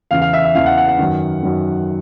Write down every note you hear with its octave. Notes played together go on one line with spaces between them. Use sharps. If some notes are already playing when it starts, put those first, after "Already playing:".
E2 C#3 E3 F5
F5
E5
E5
E2 C#3 E3 F5
F#5
F#5
F#5
F#2 D#3
F#2 D#3